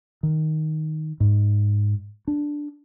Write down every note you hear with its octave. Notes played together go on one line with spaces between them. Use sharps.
D#3
G#2
D4